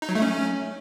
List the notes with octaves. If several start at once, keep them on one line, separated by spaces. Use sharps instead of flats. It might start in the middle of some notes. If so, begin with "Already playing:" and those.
D#4
F#3
A3
C#4